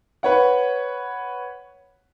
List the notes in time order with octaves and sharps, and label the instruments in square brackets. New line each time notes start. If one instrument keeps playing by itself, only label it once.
[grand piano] B4 C#5 F#5